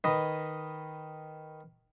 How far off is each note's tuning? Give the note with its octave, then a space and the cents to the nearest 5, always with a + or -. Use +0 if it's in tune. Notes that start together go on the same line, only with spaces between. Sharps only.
D#3 +0 B4 +0 D#5 +0